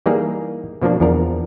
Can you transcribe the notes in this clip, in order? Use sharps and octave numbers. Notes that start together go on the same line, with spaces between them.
E3 G3 A#3 D#4 G#4 A#4
B2 F3 A#3 D4
E2 F3 D4 A#4